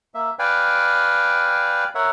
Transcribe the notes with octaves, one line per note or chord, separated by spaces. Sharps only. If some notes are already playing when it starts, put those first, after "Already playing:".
A#3 E5
B4 D5 F5 G5 G#5
A#4 C#5 E5 F#5